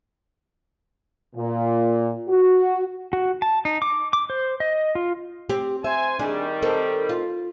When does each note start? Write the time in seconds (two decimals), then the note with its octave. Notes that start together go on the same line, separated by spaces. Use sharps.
1.36 A#2
2.28 F#4
3.13 F#4
3.42 A5
3.65 D#4
3.82 D6
4.13 D6
4.30 C5
4.60 D#5
4.95 F4
5.49 C4 G4
5.84 C5 E5 G#5
6.19 D#3 G3 D4 G#4
6.63 C4 D#4 A4 A#4
7.09 F4